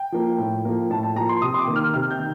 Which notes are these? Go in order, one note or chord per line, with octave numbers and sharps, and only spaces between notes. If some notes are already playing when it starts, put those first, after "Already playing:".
Already playing: G5
F3 A#3
A2
F3 A#3
A2 A5
A5
F3 A#3 A#5
C6
C3 D#6
C6
D6
D#3 A#3
F6
C3 F6
G6
D#3